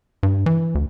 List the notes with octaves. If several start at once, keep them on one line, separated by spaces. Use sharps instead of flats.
G2
E3
D2